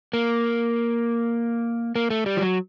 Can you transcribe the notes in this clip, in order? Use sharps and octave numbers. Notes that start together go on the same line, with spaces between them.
A#3
A#3
A3
G3
F3
F#3